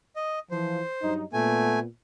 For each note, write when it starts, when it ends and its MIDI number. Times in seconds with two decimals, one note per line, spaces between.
0.16 0.39 75
0.51 0.82 52
0.51 0.82 53
0.51 1.14 72
1.02 1.23 43
1.02 1.23 54
1.02 1.23 63
1.33 1.86 46
1.33 1.79 57
1.33 1.86 59
1.33 1.79 80